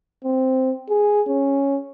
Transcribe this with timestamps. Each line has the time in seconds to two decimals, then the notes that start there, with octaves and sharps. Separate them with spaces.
0.24 C4
0.90 G#4
1.28 C#4